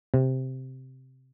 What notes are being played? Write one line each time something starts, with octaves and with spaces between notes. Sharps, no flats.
C3